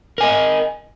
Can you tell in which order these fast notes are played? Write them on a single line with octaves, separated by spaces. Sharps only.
A#4 G#5 D#5